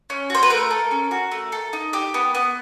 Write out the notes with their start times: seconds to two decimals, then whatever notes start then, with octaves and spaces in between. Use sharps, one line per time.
0.10 C#4
0.30 F#4 C5
0.43 B4
0.50 A3 A#4
0.71 A4
0.91 C#4
1.11 F#4
1.32 A3
1.52 A4
1.73 D#4
1.93 G4
2.14 B3
2.35 B3